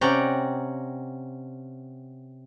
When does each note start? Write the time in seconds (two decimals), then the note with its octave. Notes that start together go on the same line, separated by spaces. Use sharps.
0.01 C3 C#4 D5 F#5 G5 A#5